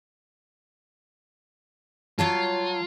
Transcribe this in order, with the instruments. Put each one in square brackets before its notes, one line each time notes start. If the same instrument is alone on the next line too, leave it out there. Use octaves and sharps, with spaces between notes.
[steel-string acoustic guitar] F#3 C#5 A5 [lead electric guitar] F4